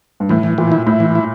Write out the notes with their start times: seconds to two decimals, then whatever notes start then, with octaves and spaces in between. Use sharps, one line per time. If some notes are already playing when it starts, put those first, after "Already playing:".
0.20 G2
0.29 A2 E3
0.43 E3
0.58 A#2 E3
0.72 E4
0.87 A2 E4
1.00 E3
1.15 E4